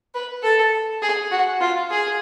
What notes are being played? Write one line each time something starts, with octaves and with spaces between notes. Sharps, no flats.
B4
A4
G#4
F#4
F4
G#4